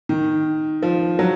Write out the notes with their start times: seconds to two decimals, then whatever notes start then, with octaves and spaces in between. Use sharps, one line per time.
0.09 D#3
0.82 F3
1.19 F#3